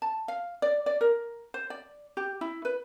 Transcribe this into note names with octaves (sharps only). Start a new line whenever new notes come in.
A5
F5
D5
D5
A#4
C5
D5
G4
E4
B4